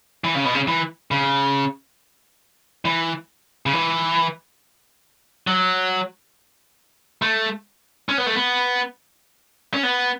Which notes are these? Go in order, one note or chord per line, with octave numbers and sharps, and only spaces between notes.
E3
C#3
B2
C#3
E3
C#3
E3
C#3
E3
F#3
A3
C#4
B3
A3
B3
C#4
B3